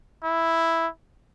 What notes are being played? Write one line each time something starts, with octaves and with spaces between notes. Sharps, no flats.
E4